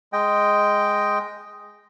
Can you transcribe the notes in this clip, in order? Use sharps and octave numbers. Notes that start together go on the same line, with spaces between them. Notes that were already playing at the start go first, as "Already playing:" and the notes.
G#3 D#5 G5